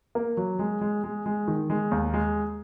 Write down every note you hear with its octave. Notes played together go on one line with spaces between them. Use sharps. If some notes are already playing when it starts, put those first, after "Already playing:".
A#3
F#3
G#3
G#3
G#3
G#3
D#3
G#3
D#2
G#3